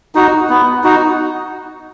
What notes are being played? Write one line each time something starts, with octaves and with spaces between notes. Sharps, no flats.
D#4 F#4
B3
D#4 F#4